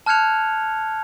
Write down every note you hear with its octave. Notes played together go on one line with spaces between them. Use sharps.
A5 F6 F#6 G#6 C#7 F7